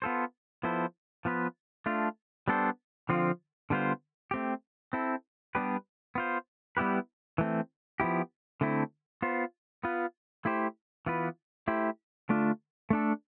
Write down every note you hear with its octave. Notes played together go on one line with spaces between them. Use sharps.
B3 F4 A4 C5
F3 B3 E4 A4 C5
F3 B3 F4 B4
A3 D4 F4
G3 B3 D4 A4 C5
D3 F3 C4 F4
D3 G3 B3 F4 C5
A3 C4 G4
C4 E4 A4
G3 B3 D4 G4 B4
B3 F4 C5
G3 B3 E4 G4 B4
E3 A3 C4
F3 B3 E4 G4
D3 A3 C4 E4
B3 F4 C5
B3 F4 B4
A3 E4 G4 C5
E3 B3 F4 B4
A3 E4 G4 C5
D3 A3 D4 F4
A3 D4 A4